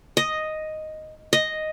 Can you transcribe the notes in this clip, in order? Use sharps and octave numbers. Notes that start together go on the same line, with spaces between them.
D#5
D#5